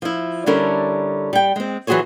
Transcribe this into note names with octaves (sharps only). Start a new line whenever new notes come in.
F3 E4
D3 G3 C#4 E4 A4 A#4
G3 G5
G#3 C4
E3 F#3 F#4 G#4 C5 C#5